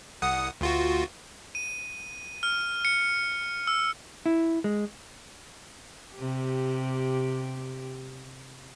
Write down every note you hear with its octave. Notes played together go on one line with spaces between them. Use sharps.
C2 F#5 D#6
D2 F4 F#4
D#7
F6
C#7
E6
E4
G#3
C3 G4